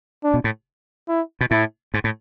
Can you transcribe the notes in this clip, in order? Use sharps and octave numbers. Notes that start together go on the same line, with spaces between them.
D4
B2
A2
E4
B2
A2 E4
G#2
A2